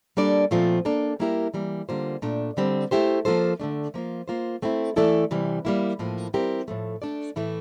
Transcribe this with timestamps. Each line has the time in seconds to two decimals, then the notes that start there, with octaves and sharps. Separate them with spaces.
0.17 G3 A#3 D4 A4 D5
0.51 A#2 F3 A3 C4 F4
0.85 A#3 D4 A4
1.19 G3 A#3 E4 G4 A#4
1.54 E3 G3 A#3
1.89 D3 G3 A#3 F4 C5
2.22 A#2 A3 D4
2.57 D3 G3 C4
2.91 A3 E4 G4 C5
3.25 F3 A#3 F4 A4 C5
3.60 D3 A3 D4
3.94 F3 A#3 F4
4.28 A#3 F4 C5
4.62 A3 C4 E4
4.96 E3 A3 E4 A4 D5
5.31 C3 E3 G3
5.65 G3 A#3 E4
5.99 A2 F3 A#3
6.33 G3 C4 E4 G4 A#4
6.68 A2 F3 A3
7.02 A3 D4 A4 D5
7.36 A2 E3 A3 E4